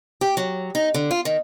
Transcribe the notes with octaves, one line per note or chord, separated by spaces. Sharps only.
G4
F#3
D#4
D3
F4
D#3